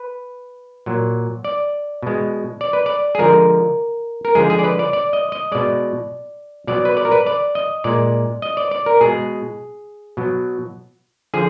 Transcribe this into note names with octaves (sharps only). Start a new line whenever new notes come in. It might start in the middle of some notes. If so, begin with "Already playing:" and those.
Already playing: B4
A#2 F#3
D5
B2 G#3
D5
B4
D5
G#4
D3 F3 G#3 A#4
A#4
D3 F3 G#3 G#4
G#4
D5
B4
D5
D5
D#5
D#5
B2 G#3 D5
B2 F#3 D5
B4
D5
A#4
B4
D5
D#5
A#2 G#3 D5
D#5
D5
D5
A#4
B2 G#3 G#4
B2 F#3
D3 F3 G#4